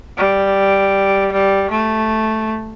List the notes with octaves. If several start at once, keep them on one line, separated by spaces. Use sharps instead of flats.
G3
G3
A3